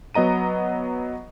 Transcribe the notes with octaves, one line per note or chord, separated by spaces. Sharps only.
F#3 B3 D#5 A#5 D#7